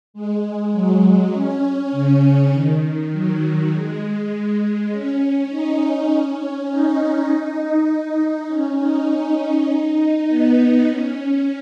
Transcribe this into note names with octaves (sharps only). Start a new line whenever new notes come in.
G#3
F#3
C#4
C#3
D#3
D#3
F#3
G#3
G#3
C#4
D#4
C#4
D#4
D#4
D#4
D#4
C#4
D#4
B3
C#4
C#4